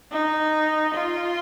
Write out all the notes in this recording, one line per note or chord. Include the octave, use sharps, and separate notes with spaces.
D#4
F4